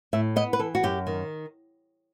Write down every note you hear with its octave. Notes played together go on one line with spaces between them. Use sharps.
A2 E5
B3 D#5
B4
E3 A4
F#4
F#2 G4
D#3